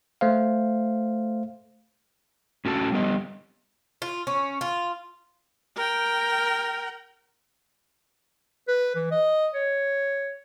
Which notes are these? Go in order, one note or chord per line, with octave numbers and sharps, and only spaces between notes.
A3 C5 F5
A2 C#4 F#4 A4 A5
G3 B3 D#5
F4
C#4
F4
A#4 G5
B4
E3
D#5
C#5